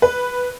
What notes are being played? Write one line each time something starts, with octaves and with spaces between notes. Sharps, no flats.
B4